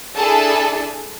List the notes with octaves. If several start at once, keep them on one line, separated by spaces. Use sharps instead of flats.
D4 E4 G#4 A4 A5